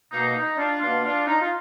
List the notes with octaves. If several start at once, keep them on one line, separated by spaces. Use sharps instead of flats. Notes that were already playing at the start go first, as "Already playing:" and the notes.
B2 A#3 D#4
D#4
D4 F4
B2 A#3 D4 F4
D4 F4
D#4
F4